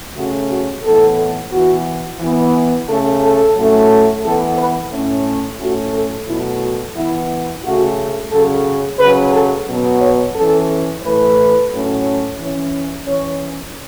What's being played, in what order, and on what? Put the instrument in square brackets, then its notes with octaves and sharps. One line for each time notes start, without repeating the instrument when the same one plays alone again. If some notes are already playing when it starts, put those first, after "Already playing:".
[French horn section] C#3 A3 C#4 F#4
F#4
A2 E3 B3 A4
E3 B3 F#4
E3 B3
C#3 A3 C#4 A4
A4
A2 F#3 A3 C#4
E3 B3 A4
B4
A2 A3 C#4
A2 A3 C#4 F#4
A4
B2 F#3 A3 E4
F#4
E3 B3 E4
C#3 A3 C#4 F#4
C#3 F#3 C#4 A4
C#3 F#3 C#4 B4
A4
B2 F#3 B3
C#5
E3 C#4 A4
A2 E3 A3 B4
A2 F#3 A3 C#4
E3 C#4
E3 C#4 C#5